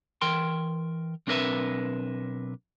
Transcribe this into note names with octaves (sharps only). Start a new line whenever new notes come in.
E3 A#4 G5 C6
B1 C4 D4 A#4 B4 E5